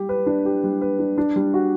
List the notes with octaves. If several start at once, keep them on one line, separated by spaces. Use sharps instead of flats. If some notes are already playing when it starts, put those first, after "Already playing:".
Already playing: G3 G4
B4
D4
G4
G3
B4
D4
D4
G3
F#4